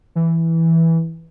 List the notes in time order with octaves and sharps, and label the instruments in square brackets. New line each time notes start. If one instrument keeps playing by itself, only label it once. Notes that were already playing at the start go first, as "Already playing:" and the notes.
[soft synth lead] E3